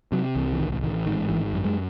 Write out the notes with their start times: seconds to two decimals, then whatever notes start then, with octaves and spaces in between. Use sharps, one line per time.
0.12 C3 F#3
0.36 C2 E3
0.53 E3
0.59 A1 D#3
0.83 A1 D#3
1.06 G#2 D#3
1.29 G#1 E3
1.53 F#2
1.65 G#3